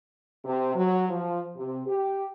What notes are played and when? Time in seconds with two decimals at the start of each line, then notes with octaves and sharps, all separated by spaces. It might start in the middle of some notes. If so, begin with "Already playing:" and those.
0.45 C3
0.75 F#3
1.09 F3
1.56 C3
1.87 G4